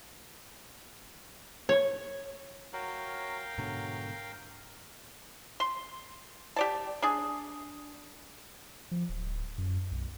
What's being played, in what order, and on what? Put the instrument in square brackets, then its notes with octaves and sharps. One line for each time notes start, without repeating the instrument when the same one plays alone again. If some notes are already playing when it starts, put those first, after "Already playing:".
[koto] C#5
[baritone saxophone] F#3 [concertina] A#4 F5 G5
[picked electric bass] G#2 B2 D3 [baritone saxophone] F#3
[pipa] C6
G4 D5 A5
D4 G#4
[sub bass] F3
D1
F#2
B1